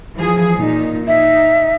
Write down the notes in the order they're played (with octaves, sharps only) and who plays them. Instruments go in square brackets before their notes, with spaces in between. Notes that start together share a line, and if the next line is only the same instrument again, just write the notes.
[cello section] E3 F3 G#4
A#2 D#4
[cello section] D#4 [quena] E5